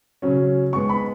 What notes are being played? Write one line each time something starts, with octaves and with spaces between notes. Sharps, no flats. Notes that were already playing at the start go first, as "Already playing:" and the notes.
C#3 F#3 C#4
G#2 G#3 B3 C#6
B5